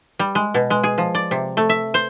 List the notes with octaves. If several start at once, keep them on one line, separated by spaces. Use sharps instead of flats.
G3
G#3
B2
G#3
G#4
F3
D5
C3
A3
E5
C5